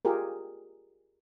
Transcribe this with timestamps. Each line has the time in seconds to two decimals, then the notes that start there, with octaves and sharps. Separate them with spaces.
0.05 F4 G4 G#4 A#4